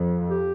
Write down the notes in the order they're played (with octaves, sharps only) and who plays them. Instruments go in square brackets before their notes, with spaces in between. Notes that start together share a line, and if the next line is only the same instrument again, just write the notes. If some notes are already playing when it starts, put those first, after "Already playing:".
Already playing: [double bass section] F2
[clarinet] G4